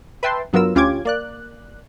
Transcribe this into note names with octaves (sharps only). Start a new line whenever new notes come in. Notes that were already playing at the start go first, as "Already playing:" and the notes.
B4 E5 G5 A5 C6
G2 F#3 B3 F4 A#4 E6
D2 C#4 F4 G4 D6 G#6
A#3 D5 F#6